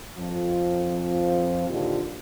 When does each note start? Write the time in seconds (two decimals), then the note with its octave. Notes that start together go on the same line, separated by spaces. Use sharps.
0.18 F2 F3
1.70 D#2 A#2 D3 F3 F4 G4